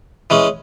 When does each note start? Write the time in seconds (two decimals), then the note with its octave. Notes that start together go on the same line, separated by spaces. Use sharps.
0.30 E3 G#3 C#4